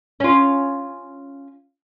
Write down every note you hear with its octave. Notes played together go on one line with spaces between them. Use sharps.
C#4 F4